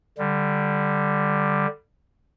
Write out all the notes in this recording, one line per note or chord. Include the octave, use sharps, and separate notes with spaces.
D3 G3